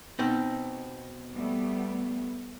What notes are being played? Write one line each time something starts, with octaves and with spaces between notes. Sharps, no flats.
B2 C4 D#4
G3 A3 B3